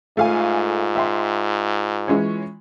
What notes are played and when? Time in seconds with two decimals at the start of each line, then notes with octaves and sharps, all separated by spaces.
0.17 G#2 A3 F4 F5 G#5
0.96 E5 G5 C6
2.08 E3 G#3 C#4